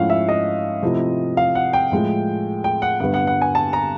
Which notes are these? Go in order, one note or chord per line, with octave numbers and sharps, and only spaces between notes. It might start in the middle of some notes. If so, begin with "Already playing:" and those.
Already playing: G#2 F3 A3 C#4 E4 F5 F#5
E5
D#5
C3 F3 A3 C4 E4
F5
F#5
G5
A2 F3 G#3
G5
F#5
G2 D3 G3 B3 F#5
F#5
F#5
G#5
A5
A#5